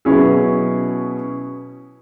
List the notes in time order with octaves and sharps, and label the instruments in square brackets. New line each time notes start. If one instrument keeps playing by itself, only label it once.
[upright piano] B2 F#3 C#4 E4 G#4